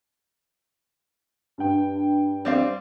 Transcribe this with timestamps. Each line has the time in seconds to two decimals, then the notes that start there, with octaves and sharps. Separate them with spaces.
1.58 G2 G5
2.45 G3 C4 F5